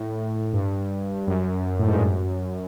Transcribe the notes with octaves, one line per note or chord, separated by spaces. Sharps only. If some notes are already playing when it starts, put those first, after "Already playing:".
Already playing: A2
G2
F#2
A2
G#2
G2
F#2